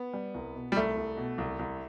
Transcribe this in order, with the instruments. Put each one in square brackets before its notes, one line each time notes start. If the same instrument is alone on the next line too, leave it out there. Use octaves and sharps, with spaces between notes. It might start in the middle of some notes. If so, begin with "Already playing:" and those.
Already playing: [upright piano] B3
[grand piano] G3
C2
B2
[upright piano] G3
[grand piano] C2 [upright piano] A3
[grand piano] C2
B2
C2
C2